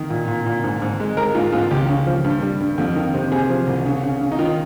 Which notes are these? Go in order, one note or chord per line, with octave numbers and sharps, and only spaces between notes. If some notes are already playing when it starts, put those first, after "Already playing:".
Already playing: D#3
A#2
A#2
A#2
G#2
G#2
G#3
G#3 A#4
G#2 F4
G#2 F4
C#2 G4
C#3
F3
G2
G3
G2
F2
D#3
C3
C3 G#4
F3
C2
C#3
C#3
C#3
D#4
D#3 F4